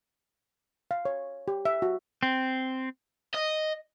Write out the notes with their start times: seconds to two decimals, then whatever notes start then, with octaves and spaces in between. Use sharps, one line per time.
0.91 F5
1.05 C#5
1.48 G4
1.65 E5
1.82 F#4
2.23 C4
3.34 D#5